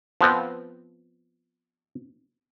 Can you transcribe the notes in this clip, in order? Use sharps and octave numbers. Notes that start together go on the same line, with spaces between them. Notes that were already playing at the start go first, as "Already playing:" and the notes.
F3 B3 C4